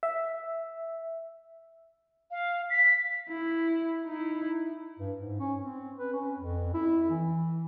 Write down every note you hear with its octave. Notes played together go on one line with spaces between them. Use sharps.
E5
F5
B6
E4
D#4 E4
G2
G#2
C#4
C4
B4
C#4
F2
E4
E3